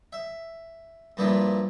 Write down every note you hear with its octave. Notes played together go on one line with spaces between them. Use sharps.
E5
G2 A#2 F3 A#3 E4